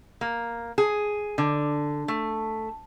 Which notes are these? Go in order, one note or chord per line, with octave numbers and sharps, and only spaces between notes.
A#3
G#4
D3
A3